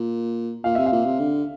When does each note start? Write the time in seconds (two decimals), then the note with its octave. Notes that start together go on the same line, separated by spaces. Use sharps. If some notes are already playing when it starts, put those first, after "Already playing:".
Already playing: A#2
0.64 A#2 F5
0.75 C3 E5
0.86 F5
0.92 A#2
1.05 C3
1.19 D3